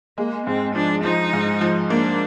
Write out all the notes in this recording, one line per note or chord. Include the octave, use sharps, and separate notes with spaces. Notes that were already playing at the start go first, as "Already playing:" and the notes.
G#3 A#3
G#2 C4
F3 D4
F3 D#4
G#2
F3
A#3 D4